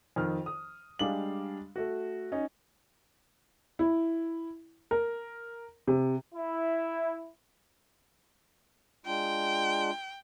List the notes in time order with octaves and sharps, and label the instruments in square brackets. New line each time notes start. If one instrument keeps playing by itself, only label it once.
[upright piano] F2 D#3 F6
D#6
G3 G#3 D4 F5 F#7
A3 F#4
C#4 D#4
E4
A#4
C3
[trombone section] E4
[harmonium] G#3 D4 F4 [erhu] G5